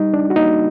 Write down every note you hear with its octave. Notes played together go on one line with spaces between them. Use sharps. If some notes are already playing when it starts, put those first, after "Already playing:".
Already playing: G3 D#4
D4
F#4
A#3 D#4